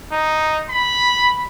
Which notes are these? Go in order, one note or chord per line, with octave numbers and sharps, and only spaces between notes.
D#4
B5